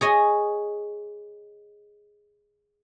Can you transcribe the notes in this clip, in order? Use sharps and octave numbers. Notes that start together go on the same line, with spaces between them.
G#4 C#5 D#5